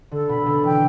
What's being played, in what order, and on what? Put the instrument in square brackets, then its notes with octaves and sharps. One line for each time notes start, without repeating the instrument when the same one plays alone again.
[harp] D3 [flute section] A4
[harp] B2 [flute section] B5
[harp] B2 D3 [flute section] A4
[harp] E3 [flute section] G5